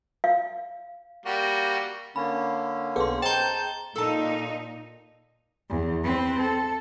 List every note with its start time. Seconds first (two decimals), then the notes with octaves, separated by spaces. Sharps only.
0.24 F5
1.26 G3 A#3 F#4
2.16 D3 A#3 C#4 B5
2.96 B1 B3 G#4 A4 C6
3.22 G#4 C5 D#5 G5 A5 A#5 G6
3.96 A#2 D#4 A4 A5
5.70 E2
6.04 C4 B4
6.40 A4